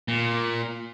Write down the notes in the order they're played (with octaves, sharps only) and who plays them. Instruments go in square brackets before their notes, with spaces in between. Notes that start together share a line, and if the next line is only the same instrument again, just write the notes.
[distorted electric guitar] A#2